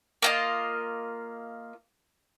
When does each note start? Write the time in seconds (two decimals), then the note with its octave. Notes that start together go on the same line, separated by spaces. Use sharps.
0.22 A#3 F4 D#5